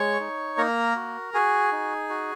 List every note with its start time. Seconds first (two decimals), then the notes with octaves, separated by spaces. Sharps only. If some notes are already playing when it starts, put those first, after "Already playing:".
Already playing: G#3 C#5 C#6
0.20 D#4
0.58 A#3 A#4 A#5
0.96 F#4
1.34 F#4 G#4 G#5
1.72 D#4
2.10 F#4